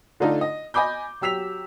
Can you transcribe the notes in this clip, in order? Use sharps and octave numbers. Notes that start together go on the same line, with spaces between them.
D3 A3 D4 D#4 F4 A4
D#5
D#5 G#5 B5 D6 G6
F#3 G4 E6 B6 F7